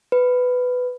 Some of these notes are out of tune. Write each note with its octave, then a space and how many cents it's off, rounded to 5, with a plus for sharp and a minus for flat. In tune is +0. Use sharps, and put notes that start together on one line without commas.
B4 +10